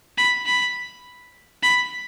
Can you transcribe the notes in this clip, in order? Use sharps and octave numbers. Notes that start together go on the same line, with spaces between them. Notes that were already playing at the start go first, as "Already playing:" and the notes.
B5
B5
B5